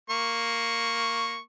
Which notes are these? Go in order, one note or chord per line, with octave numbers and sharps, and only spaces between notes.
A#3 C#6